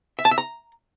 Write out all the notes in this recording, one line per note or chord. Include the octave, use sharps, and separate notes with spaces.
E5
A5
E5
A#5